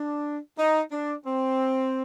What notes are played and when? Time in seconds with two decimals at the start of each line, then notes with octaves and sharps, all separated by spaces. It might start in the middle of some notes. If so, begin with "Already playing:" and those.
Already playing: D4
0.58 D#4
0.92 D4
1.25 C4